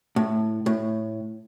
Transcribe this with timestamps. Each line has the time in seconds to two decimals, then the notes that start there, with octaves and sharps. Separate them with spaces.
0.16 A2
0.66 A2